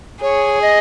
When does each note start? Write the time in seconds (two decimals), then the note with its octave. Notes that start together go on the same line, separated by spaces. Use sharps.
0.22 G#4 C#5
0.62 D#5